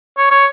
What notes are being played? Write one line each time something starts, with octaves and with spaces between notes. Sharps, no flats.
C#5
C#5